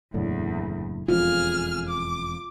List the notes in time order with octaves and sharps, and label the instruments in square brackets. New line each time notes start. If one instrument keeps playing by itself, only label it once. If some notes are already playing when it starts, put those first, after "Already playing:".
[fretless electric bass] F#1 A2 D3 [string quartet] E2
[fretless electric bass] E1 F2 [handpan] F4 [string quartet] G#4 F6
[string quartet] D6